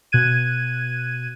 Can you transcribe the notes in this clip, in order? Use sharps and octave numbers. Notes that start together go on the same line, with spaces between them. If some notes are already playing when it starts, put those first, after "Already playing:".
B2 F#6 G#6 D#7